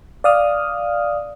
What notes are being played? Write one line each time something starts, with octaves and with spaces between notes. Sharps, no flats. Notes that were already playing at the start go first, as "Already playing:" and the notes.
D5 F5 D#6 F6